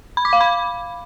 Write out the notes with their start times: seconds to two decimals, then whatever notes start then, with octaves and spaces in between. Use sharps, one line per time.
0.17 B5
0.25 D6
0.33 F5
0.41 B5